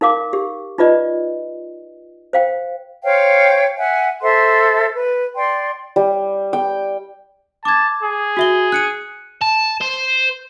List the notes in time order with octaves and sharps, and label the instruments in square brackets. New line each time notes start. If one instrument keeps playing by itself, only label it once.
[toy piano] D#4 A#4 F5 D6
G4
D#4 F4 B4 D5 D#5
C5 F5 G5
[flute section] C5 C#5 F5 G5
E5 F#5 G#5
A4 C5 E5 C6
B4
D5 G5 C6
[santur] G3
G5
[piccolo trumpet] A5 [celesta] D6 G#6
[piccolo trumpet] G#4
[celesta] F#4 E5 G7
F#6 C#7 D#7
[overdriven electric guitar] A5
C5